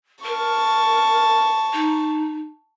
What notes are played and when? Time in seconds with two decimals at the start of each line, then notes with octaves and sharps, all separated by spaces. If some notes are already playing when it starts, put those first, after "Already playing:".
0.25 A#4 A5 C#6
1.73 D#4